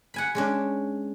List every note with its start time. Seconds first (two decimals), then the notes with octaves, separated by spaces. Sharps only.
0.14 F#5 G#5 B5
0.35 G#3 C#4 D4